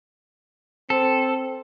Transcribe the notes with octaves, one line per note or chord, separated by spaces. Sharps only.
C4 A4